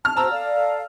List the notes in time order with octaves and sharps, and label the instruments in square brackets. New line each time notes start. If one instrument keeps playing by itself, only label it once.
[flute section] A5 [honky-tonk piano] F6
[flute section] F#4 C5 [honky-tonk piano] A5 A#5 E6
[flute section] A4 D5 F5